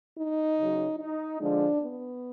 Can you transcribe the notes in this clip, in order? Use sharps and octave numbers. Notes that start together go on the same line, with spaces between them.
D#4
C#3 F#3
D#4
D3 F3 G#3 D4
B3